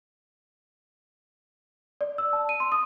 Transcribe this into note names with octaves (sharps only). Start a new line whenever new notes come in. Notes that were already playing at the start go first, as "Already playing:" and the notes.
D5
E6
A5
D#7
C6
D#6